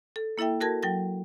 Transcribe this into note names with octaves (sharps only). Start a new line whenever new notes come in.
A4
A#3 E4 A4 E5 G5
F#4 A4 A#4 A5 G#6 A#6
F#3 G5 A#6